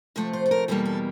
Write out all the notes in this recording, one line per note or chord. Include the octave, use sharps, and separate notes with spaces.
C3 F3 A3 E5
C5
A4
A#4
E2 B2 G3 A#3 A4
A4